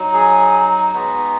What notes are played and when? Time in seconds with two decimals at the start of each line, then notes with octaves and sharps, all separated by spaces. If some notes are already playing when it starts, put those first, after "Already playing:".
Already playing: F#3 D#4
0.13 G#4
0.94 G#3 B3 D#4 F#4